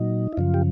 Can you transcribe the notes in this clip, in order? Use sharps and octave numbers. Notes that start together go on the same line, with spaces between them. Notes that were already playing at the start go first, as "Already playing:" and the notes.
Already playing: A#2 F#3 D#4
E4
F#2 C#3 F3 F4
G4